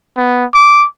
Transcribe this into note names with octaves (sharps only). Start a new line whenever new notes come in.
B3
D6